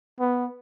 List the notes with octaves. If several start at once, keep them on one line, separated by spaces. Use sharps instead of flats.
B3